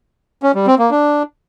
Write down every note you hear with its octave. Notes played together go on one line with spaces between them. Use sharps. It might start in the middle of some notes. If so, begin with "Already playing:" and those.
C#4
G3
C4
A#3
D4